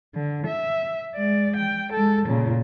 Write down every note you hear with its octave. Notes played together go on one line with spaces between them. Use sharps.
D3
E5
G#3 D5
G5
G#3 A4
A#2 C#3